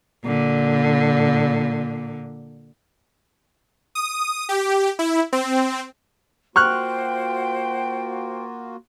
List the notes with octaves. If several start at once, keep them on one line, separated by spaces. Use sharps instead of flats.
A#2 D3
D#6
G4
E4
C4
A#3 F4 F#4 C5 G5 C#6 F6 F#6